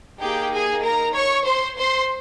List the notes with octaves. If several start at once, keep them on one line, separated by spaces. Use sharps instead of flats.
A#3 D#4 G4 G#4 G5
G#4 G#5
A#4 A#5
C#5 C#6
C5 C6
C5 C6